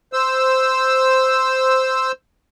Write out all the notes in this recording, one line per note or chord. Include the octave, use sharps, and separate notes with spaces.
C5 E6